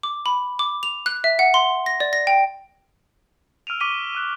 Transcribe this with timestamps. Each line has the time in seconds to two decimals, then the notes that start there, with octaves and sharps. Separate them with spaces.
0.03 D6
0.26 B5
0.59 D6
0.83 F7
1.06 F#6
1.24 E5
1.39 F#5
1.54 C6
1.86 A#6
2.00 D5
2.13 A#6
2.27 G5
3.67 E6 F6 D7 D#7 F7
3.80 C#6 D6 B6 D#7 F7 G7
4.15 E6 F#6 D#7